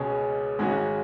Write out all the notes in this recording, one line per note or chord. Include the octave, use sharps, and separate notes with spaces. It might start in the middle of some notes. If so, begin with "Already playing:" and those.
Already playing: C#2 B2 G#3 C#4
G#1 G#2 G#3 C#4 F#4